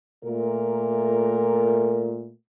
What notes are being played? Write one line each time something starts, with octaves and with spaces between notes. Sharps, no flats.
A#2 A3 A#4